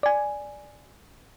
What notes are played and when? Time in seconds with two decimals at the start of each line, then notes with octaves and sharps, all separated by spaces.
0.03 D5 G#5